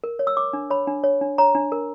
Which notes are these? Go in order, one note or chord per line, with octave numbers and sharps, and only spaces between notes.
A#4
C#5
E6
C#5 D6
D4
C#5 B5
D4
C#5
D4
C#5 A#5
D4
A#4